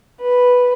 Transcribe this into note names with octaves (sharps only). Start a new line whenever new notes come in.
B4